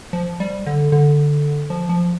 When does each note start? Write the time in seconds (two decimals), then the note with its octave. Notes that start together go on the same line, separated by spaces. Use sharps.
0.13 F3
0.40 G3
0.66 D3
0.92 D3
1.70 F3
1.89 F3